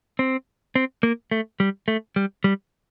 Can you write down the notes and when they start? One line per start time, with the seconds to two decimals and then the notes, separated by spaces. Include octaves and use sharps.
0.19 C4
0.75 C4
1.03 A#3
1.31 A3
1.60 G3
1.88 A3
2.16 G3
2.44 G3